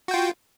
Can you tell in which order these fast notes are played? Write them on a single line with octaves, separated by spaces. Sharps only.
F#4 G5 F4